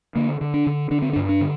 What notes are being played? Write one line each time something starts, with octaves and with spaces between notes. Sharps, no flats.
D3 A#3
D3
D4
D3
D3 D4
C4
D4
G2
D4
D3